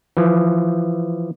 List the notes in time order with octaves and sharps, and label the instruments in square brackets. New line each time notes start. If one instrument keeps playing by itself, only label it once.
[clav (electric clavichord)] E3 F3